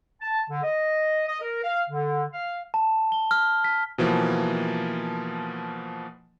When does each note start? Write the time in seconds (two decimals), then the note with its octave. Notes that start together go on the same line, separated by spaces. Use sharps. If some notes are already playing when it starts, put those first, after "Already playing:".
0.21 A5
0.50 D3
0.64 D#5
1.28 D#5
1.41 A#4
1.63 F5
1.90 D3
2.33 F5
2.74 A5
3.12 G7
3.31 F6
3.64 B6
3.98 B2 E3 F3 A#3